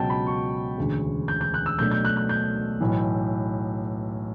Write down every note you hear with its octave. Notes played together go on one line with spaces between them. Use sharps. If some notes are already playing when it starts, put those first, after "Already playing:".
Already playing: C#2 B2 F#3 G5 A5
B5
C#6
E1 D2 C#3
G6
G6
F#6
E6
B1 B2 A3 D4 G6
G6
F#6
F#6
G6
B1 A2 E3